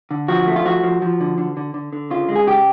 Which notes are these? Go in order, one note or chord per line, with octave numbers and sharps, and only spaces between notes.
D3
F3 F#4
A3
F4
F3 F#4
F3
F3
D3
D3
D3
D3
D3
C#3 F4
G#3
G#4
C#3 G4